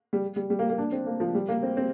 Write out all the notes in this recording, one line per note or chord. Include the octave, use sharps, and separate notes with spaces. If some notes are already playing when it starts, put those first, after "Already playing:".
G3
G3
G3
A#3
A#3
D4
C4
A#3
F3
G3
A#3
C4
C4